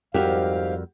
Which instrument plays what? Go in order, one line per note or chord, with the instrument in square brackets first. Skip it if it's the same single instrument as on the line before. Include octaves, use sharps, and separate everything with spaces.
[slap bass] F2 [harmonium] G#2 F5 [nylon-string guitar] G3 F#4 A#4 [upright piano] G4